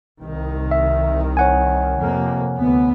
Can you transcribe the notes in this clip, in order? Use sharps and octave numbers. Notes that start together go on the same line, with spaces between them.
C2 D#3
E5
C#5 F#5 G#5
F2 C3 A#3
D2 B3